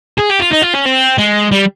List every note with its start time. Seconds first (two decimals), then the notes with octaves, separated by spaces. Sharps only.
0.19 G#4
0.31 G4
0.41 F4
0.53 D#4
0.63 F4
0.75 C#4
0.86 C4
1.18 G#3
1.51 G3